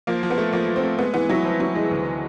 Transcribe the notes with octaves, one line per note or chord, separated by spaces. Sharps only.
F3 A#3
F3
B3
A3
F3 A#3
F3
C4
A3
G#3 B3
E3 B3
F#3 E4
F3 C4
F#3 E4
E3 G#3
D2